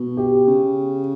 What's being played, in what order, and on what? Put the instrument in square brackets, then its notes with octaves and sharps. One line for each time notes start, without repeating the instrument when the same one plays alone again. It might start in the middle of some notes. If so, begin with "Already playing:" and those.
Already playing: [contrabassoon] B2
[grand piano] G4
[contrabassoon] C#3